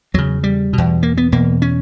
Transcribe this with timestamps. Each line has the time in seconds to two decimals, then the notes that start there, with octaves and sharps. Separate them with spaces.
0.14 E2 C#3 F#3
0.44 G3
0.73 E2 B2
1.03 A#3
1.17 B3
1.32 E2 B2 A#3
1.62 C#4